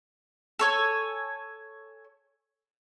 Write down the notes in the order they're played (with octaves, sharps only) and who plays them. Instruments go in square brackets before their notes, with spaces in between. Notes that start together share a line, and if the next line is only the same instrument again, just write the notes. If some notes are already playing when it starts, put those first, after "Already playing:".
[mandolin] A4 C#5 G#5